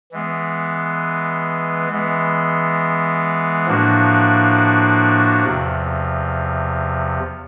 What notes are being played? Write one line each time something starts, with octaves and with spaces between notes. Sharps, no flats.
E3 G#3 B3
E3 G#3 B3
A2 F3 A#3 D4 F#4
E2 C3 F3